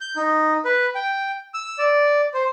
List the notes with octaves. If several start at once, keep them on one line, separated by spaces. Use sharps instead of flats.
G6
D#4
B4
G5
E6
D5
C5